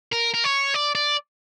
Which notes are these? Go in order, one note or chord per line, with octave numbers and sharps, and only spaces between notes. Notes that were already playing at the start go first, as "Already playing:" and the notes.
A#4
A#4
C#5
D5
D5